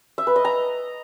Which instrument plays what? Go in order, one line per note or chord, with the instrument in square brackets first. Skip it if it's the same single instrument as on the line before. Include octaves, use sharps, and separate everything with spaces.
[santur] E5
B4
D#5
A#5